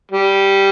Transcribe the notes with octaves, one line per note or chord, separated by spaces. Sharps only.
G3